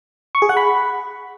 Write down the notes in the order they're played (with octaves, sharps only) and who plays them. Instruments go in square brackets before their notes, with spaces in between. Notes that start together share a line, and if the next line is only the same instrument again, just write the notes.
[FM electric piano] C#6
G#4
F#5
B5